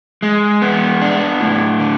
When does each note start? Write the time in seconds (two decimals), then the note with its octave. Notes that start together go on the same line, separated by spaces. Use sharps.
0.23 G#3
0.62 B3
1.01 D4
1.41 A2
1.80 D3